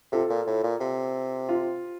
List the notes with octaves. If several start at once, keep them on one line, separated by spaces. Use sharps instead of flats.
C3 F4 A4
A#2
A2
A#2
C3
F4